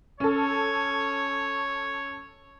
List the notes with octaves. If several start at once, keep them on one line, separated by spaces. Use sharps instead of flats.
C#4 A4 C#5